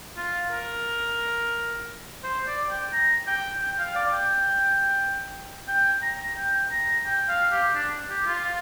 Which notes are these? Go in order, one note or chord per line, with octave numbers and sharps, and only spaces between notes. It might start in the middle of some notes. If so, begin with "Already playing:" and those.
F4
A#4
C5
D5
G5
A#5
G5
G5
F5
D5
G5
G5
A#5
G5
A#5
G5
F5
G4
D4
G4
F4